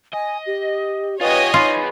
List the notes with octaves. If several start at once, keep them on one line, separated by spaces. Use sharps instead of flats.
D#5 G#5
G4
F4 G4 B4 C#5 D#5 G#5
D#4 F4 G#4 B4